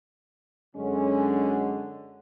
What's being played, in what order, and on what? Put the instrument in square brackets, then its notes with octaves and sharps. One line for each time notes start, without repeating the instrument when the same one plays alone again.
[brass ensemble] F#2 D3 G#3 C#4